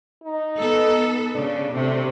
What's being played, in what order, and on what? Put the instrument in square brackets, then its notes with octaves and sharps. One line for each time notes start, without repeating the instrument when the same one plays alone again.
[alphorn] D#4
[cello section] B3 A4
[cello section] C#3 [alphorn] D4
[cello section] C3 [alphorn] A3